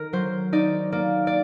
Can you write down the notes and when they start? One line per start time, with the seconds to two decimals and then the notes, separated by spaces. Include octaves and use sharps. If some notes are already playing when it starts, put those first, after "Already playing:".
Already playing: D#3 A#4
0.13 F#3 C5
0.53 D#4 D5
0.92 A#3 D5
1.27 D5